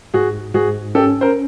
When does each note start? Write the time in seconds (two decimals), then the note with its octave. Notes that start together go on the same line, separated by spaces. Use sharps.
0.14 G#2 F#4 G#4
0.54 G#2 F#4 G#4
0.95 C#4 G4 A4
1.21 A#4 C5